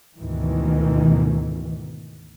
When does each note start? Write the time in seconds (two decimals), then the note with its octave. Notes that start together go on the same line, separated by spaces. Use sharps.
0.18 D2 G#2 B2 D#3 E3